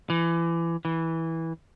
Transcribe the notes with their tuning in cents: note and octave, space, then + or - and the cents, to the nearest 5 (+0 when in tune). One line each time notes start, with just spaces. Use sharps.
E3 +25
E3 -10